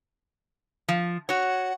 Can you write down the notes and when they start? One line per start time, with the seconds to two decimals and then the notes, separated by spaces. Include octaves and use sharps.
0.88 F3
1.29 F#4 C#5 F#5